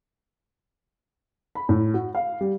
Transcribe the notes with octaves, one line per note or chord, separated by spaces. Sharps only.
B5
A2
F#4
F5
G3